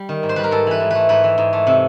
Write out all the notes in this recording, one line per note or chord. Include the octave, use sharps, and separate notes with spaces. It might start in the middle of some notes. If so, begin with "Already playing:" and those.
Already playing: G3
D#3
G#2
C5
G3 B4
A#4
G#2 A4
E3 B4
G#2
A3 B4
G#2 B4
E3
G#2
A3
C3